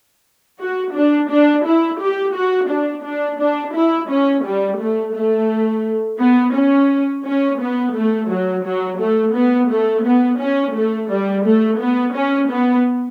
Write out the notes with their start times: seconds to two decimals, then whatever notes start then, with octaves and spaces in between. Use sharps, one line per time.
0.59 F#4
0.95 D4
1.29 D4
1.65 E4
2.00 G4
2.35 F#4
2.69 D4
3.04 D4
3.40 D4
3.74 E4
4.09 C#4
4.44 G3
4.80 A3
5.14 A3
6.19 B3
6.54 C#4
7.25 C#4
7.59 B3
7.95 A3
8.29 F#3
8.64 F#3
8.99 A3
9.34 B3
9.70 A3
10.04 B3
10.39 C#4
10.74 A3
11.09 G3
11.45 A3
11.79 B3
12.14 C#4
12.49 B3